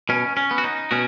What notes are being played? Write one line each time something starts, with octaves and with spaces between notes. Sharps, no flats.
B2 C#4
C#4
B3
F#4
D#4
B2 C#4 F#4